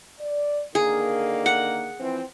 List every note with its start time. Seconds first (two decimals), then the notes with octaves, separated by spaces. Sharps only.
0.19 D5
0.75 D3 D#3 A#3 G#4
1.46 F#5
1.99 E3 F3 C4